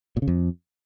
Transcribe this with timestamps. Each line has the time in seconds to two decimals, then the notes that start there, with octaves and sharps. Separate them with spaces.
0.17 A#2
0.22 C#3
0.28 F2